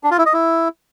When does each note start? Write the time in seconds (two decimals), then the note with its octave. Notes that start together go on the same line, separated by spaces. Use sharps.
0.04 D4
0.11 F4
0.18 E4
0.26 D#5
0.33 E4